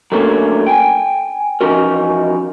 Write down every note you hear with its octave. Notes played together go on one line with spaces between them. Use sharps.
F#3 A3 A#3 C#4 D4
G5 G#5
E3 F3 C#4 D#4 F#4 A#4